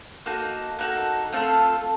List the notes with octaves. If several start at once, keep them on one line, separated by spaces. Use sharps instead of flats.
A#3 D#4 F#4 A4
A#3 D#4 F#4 A4
A3 C4 F4 A4 F5